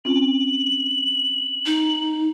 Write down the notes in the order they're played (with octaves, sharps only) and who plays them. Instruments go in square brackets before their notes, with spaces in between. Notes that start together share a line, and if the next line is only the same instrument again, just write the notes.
[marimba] C4 C#4 F4 [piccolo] F#7
[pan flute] D#4